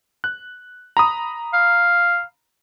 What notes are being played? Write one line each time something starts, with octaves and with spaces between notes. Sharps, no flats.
F#6
A#5 B5 D#6
F5